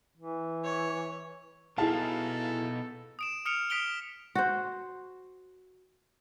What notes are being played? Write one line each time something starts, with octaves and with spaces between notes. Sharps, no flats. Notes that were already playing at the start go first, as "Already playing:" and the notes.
E3
C#5
B2 D#4 E4 G#4 A4 F5 A5
D#6 D7 E7
D#6 F6 C#7 D7 F7
D#6 F6 B6 D7 F7 G7
F#4 C5